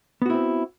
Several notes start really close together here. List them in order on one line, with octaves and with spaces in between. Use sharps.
B3 F#4 E4 C4